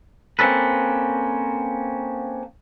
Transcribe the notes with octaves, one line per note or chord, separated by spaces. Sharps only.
A#3 C4 C#4 A4 B4